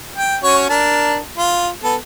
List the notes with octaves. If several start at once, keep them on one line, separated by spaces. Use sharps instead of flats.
G5
C#4 F#4 C#5
D4 A#4 A5
F4
B3 A4